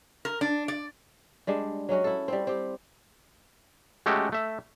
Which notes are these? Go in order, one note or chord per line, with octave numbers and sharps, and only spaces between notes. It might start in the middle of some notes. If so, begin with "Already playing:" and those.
A#4
D4
D5
G3 G#3 D4
F#3 G#3 C#4 F#4
E4 A4
G3 C4
C4 G4
G#3 A3 C#4 F#4 G4 A4
A3 E5